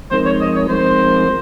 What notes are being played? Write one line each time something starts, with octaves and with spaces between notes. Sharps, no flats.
F3 G#3 C4 D#4 A#4 C5
C#5
D#5
C#5
F3 G#3 C4 D#4 A#4 C5